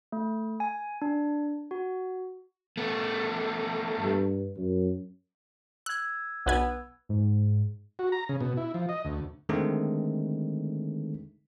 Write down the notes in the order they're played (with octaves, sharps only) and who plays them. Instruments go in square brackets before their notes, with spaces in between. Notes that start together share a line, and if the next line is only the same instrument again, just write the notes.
[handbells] A3
G#5
D4
F#4
[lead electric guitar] A3 B3
[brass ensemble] G2
F#2
[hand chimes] E6 G#6 [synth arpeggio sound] F#6
[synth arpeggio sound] B1 B4 G#5 [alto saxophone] B3
[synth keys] G#2
[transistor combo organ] F#4
A#5
C#3
B2
E4
F3
D#5
D2
[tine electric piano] D3 D#3 G#3 A3 C4 D#4